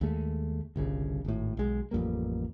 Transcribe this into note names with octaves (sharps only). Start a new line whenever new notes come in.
D#2 G#3 A3
G1 C2 C#3
G#1 A2
B1 G#3
A1 F2 G3 A#3